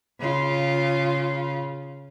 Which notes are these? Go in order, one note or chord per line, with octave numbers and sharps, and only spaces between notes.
C#3 F4